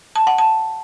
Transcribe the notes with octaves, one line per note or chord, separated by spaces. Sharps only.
A5
F#5
A5